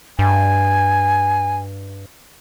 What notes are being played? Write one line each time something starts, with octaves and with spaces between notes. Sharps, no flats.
G2 G#5